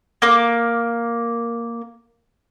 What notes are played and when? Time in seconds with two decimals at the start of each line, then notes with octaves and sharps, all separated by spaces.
0.22 A#3 D6